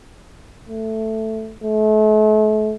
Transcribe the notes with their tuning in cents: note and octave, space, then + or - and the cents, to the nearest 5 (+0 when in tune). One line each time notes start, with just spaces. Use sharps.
A3 +5
A3 -40